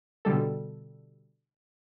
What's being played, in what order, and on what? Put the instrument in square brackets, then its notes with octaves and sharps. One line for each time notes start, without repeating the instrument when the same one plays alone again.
[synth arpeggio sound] B2 D3 G3 A4